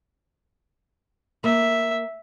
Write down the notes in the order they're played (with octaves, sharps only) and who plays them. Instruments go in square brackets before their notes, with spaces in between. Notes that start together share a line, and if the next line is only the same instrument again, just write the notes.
[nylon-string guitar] A#3 [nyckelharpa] E5